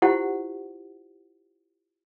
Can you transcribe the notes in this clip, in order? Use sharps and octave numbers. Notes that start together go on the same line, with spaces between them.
E4 F4 G4 C5 F#5